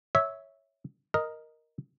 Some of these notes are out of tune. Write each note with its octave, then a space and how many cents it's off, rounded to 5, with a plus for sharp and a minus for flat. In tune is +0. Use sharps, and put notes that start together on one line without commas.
C#5 +0 E5 -10
A#4 +0 D#5 +0